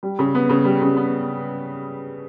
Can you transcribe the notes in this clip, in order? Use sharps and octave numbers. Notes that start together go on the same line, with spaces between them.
G3
C#3
B3
C#3
G3
C#3
B3